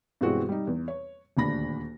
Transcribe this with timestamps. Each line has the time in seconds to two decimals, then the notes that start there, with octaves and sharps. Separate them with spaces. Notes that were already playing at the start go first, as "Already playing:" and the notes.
0.21 G2 B2 E3 G#3 C4 F#4
0.49 G3 D#4
0.67 E2
0.88 C#5
1.37 D#1 D2 D4 B5 A#6